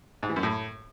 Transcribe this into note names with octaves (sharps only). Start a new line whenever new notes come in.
G#2
E3
F#2
A2